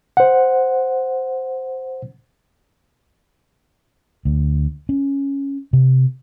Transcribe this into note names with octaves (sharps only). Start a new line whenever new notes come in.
C5 F#5
D2
C#4
C3